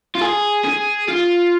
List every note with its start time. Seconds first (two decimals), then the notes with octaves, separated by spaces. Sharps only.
0.15 F4
0.21 G#4
0.64 G#4
1.08 F4